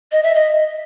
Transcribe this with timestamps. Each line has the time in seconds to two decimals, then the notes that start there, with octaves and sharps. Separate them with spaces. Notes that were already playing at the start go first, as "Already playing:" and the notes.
0.12 D#5
0.23 E5
0.35 D#5